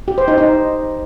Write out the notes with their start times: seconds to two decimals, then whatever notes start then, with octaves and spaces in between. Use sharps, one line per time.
0.08 G4
0.18 C5
0.28 D#4
0.38 D#4